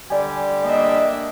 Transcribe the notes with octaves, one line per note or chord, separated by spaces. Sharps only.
D3 G3 G4 D5 G#5
A#3 D4 D#5 E5